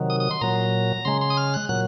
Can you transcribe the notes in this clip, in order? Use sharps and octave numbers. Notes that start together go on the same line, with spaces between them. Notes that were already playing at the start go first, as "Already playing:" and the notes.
Already playing: C3 D#3 F#3
D#6
D#6
C6
A#2 F#3 A#5
C#3 G#3 C6
C6
D#6
F6
F#6
A#2 F#3 F#6